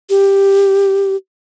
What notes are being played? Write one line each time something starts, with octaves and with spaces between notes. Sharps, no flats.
G4